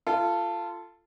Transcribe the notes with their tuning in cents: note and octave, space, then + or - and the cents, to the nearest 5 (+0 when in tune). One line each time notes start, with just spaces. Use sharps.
F4 -20 A4 +5